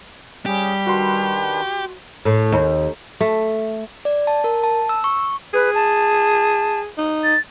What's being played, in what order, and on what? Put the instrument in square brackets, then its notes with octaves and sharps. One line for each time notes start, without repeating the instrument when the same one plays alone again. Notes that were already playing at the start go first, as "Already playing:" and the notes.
[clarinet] G3 [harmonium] C#4 G#4 [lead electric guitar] G4
[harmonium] D#3 D4 B4 [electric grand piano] F#4 C6
[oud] A2
D#2
[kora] A3
[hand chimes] D5
A5
A#4
A5
E6
C#6
[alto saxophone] G#4 [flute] B4
[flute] A5
[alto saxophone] D#4
[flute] A6